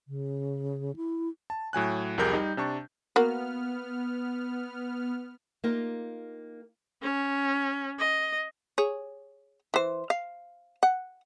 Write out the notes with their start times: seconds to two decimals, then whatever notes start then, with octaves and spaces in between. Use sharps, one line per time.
0.08 C#3
0.96 E4
1.50 A5
1.73 A2 F#3 G#5 F#6
2.18 C2 F2 G4 G#4 A#4 G6
2.33 G3 D#4
2.57 C3 D4 A5 C#6
3.16 A#3 B3 F#4 F6
5.64 A#3 D#4 F4 G4 A#4
7.02 C#4
7.99 D#5
8.78 G#4 C#5
9.74 E3 C5
10.10 F5
10.83 F#5